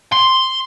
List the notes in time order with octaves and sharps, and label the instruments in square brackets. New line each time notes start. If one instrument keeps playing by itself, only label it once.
[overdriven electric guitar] C6